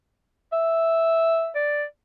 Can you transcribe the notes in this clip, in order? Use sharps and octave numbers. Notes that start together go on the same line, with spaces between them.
E5
D5